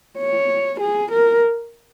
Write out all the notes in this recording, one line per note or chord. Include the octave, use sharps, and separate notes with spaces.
C#5
G#4
A#4